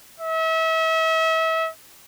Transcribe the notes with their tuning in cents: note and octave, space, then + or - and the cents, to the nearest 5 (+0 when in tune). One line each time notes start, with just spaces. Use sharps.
E5 -35